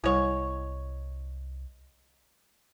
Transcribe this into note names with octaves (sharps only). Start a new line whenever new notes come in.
C2 G3 G#3 E4 C#5